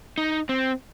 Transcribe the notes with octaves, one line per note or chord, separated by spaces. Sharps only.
D#4
C4